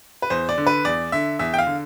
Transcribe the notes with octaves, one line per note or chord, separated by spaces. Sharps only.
B4
E2 C5
D5
D3
B4
E2 D5
D3 E5
E2 E5
G5
F5
D3